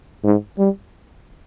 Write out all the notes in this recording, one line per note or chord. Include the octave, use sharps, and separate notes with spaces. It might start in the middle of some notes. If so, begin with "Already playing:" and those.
G#2
G3